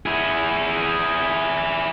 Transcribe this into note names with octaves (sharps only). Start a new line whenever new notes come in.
E4 G#4